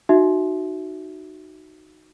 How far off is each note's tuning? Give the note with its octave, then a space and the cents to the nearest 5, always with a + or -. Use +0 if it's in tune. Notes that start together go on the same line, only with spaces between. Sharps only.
D#4 -10 F#4 +0 E5 +0